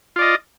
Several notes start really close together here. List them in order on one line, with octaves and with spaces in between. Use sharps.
F4 D5 D#5